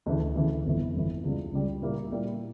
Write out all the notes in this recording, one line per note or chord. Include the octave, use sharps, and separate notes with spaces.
D2 C#3 E3
D2 C#3 E3
G1 F2 E3
G1 F2 E3
C#2 C#3 G3
C#2 C#3 G3
A#2 G3 A#3 E4 G4
A#2 G3 A#3 E4 G4